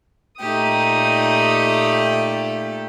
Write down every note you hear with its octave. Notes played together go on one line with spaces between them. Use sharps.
A#2 A3 D#4 G4 D#6